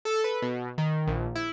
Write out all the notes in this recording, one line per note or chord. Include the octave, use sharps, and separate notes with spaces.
A4
B4
B2
D#3
A#1
E4